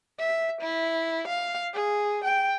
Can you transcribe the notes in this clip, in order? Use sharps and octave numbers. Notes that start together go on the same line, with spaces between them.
E5
E4
F5
G#4
G5